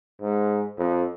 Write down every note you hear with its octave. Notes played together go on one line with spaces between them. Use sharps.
G#2
F2